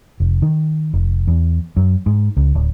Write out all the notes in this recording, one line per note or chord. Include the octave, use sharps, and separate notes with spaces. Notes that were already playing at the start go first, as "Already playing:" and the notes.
F1
D#3
F1
E2
F#2
G#2
C#2
D1